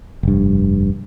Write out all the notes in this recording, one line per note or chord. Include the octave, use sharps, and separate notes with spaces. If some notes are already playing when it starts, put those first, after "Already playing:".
F1 G2